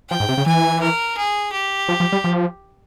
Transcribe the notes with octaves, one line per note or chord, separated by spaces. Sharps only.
F3 G5
G#2
C3
C#3
E3 G#5
A#4
G#4
G4
F3
F3
G3
F3